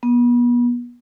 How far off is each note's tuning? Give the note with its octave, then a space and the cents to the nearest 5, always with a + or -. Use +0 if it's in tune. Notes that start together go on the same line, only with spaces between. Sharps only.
B3 -35